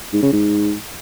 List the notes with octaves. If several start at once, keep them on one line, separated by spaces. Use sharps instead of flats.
G#2
C#3
G#2